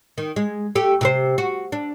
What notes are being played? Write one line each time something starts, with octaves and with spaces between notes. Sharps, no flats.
D#3
G#3
A3 G4
C3 G4 C5
F#4
D4